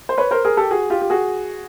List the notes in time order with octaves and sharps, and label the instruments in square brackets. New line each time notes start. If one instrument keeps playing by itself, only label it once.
[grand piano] C5
B4 C#5
A#4 C5
G#4 A#4
G4 A4
F#4 G#4
F4 G4
G4
F#4 G#4